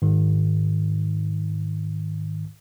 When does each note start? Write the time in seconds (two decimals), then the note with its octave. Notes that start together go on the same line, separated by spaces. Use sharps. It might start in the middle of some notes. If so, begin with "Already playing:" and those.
0.02 G#2 D#3